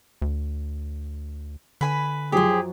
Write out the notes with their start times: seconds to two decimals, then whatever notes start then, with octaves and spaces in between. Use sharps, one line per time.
0.22 D2
1.81 D3 B4 G#5 B5
2.32 F#2 F3 F#3 G4 G#4 C5